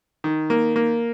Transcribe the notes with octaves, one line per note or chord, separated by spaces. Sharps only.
D#3
A#3
A#3